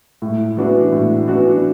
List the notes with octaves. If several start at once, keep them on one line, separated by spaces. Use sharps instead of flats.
A2
E3 B3 D4 F#4
A2
E3 B3 D4 F#4